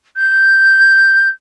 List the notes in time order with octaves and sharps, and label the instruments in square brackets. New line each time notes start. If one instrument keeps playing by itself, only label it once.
[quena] G6